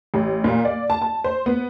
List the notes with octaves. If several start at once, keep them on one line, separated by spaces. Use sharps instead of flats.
A1
A#2
D5
A5
A5
C5
B3